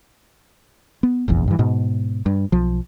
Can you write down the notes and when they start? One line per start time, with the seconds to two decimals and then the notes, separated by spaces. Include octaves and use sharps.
1.03 B3
1.28 F1 A#1 E2
1.48 G2 E3
1.59 G#2 B2
2.26 G2
2.52 B1 F3